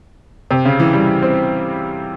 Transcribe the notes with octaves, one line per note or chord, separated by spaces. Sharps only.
C3
C#3
E3
G3
C4